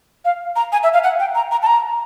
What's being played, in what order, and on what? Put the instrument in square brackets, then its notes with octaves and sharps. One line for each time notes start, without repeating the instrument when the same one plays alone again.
[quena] F5
A#5
G#5
E5
F5
F#5
G5
A#5
A#5
A5
A#5